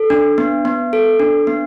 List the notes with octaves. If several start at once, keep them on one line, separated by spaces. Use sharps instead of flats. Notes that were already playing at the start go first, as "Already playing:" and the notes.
Already playing: A4
D4
B3
B3
A4
D4
B3